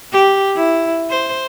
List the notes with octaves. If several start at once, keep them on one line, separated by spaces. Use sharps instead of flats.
G4
E4
C5